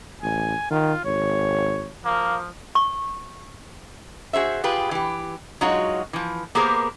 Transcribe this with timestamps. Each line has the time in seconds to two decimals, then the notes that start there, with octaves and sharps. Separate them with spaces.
0.22 A1 G#5
0.71 D#3 F4
1.05 G#1 C#5
2.05 F3 A#3
2.75 C#6
4.33 F#4 G#4 C5 E5
4.64 F4 G4 G#4 B4
4.91 E3 G4
5.61 F#3 G#3 D#4 F4 F#4 C#5
6.13 E3 F3
6.55 A#3 B3 G4 G#4 A#4 C5